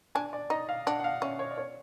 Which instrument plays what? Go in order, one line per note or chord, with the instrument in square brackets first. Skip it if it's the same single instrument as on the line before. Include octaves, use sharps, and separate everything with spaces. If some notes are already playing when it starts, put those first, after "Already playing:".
[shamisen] D4 [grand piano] G#5
[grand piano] D5
[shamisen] D#4 [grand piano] D#5
[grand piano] F5
[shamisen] D4 [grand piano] F#5
[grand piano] F#5
F5
[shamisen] C#4 [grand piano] E5
[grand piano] C#5
D5
C#5